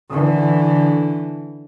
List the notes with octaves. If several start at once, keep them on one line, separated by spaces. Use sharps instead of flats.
D3 E3